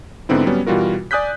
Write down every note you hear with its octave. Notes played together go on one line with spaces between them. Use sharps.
G#2 D3 B3 C4 E4
F#3 G3 B3 C#4
B2 E3 G3 F4 F#4 A#4
D5 G#5 D#6 F#6 G6 B6